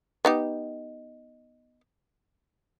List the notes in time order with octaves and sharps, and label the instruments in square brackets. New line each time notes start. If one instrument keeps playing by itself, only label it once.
[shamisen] B3 D#4 G4